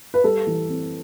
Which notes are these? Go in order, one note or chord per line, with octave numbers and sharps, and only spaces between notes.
B4
G3 A4
E3
C4